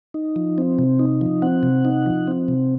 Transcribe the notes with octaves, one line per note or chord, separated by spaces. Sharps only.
D#4
F3
C4
C3
D#4
F3
C4 F#5
C3
D#4
F3
C4
C3